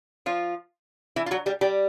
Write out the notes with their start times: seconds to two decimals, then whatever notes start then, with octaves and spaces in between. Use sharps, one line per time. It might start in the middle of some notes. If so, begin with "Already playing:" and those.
0.26 F3 F4
1.16 E3 E4
1.26 F4
1.31 F#3 F#4
1.46 G3 G4
1.61 G3 G4